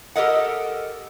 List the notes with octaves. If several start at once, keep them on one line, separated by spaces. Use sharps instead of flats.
G4 A4 A#4 D#5 F#5